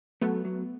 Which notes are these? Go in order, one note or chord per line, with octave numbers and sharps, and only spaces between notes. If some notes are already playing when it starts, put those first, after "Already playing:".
F#3 A3 B3
F#3